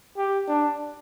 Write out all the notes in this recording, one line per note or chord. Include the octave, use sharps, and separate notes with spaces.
G4
D4